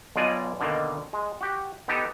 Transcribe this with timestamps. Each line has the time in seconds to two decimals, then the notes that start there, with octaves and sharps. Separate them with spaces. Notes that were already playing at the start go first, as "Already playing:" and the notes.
0.16 B1 B2 F4 D5 D#5 G#5
0.60 B2 D3 D#3 A#3
1.13 G#3
1.41 F#4 G4
1.88 B3 D#4 G4 A4